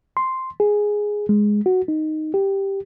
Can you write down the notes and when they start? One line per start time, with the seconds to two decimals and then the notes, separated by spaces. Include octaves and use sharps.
0.17 C6
0.60 G#4
1.29 G#3
1.66 F#4
1.88 D#4
2.34 G4